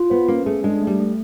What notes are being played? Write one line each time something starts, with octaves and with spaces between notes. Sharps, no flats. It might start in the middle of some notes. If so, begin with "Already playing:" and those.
Already playing: F4
B3 C5
A#3 C#4
A3 G#4
G#3 D4
A3
G3
A3